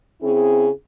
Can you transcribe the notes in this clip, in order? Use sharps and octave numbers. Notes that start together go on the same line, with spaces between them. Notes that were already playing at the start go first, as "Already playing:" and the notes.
C#3 C4 E4 G#4